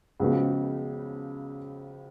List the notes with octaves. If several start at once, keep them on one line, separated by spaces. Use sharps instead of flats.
C#2 C#3 F3 B3 F#4